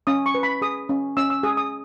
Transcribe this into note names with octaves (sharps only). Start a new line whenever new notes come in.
C#4 D#6
C#6
B4
B5
G#4 D#6
C#4
C#4 E6
E6
G#4 D#6
D#6